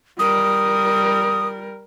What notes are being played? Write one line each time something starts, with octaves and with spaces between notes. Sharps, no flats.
G3 A#4 D#6